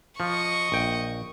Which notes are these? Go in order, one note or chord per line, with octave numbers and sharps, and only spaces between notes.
F3 D#5 C#6
A#1 G5